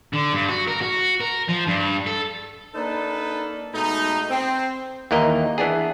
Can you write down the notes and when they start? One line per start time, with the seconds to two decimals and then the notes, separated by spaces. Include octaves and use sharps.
0.13 D3
0.33 G2
0.49 F#4
0.67 A#4
0.81 F#4
1.20 A#4
1.48 F3
1.67 G2
2.06 A4
2.75 A#3 D4 D#4 A4 B4
3.74 B2 G#3 A3 D#4
4.30 C4
5.11 D#2 E3 A#3 A#4 D#5
5.58 E3 B3 D4 G#4